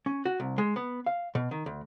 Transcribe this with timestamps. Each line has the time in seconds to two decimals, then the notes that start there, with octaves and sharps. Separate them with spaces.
0.06 C#4
0.25 F#4
0.40 C2
0.58 G#3
0.76 B3
1.06 F5
1.35 B2
1.51 D#3
1.66 D2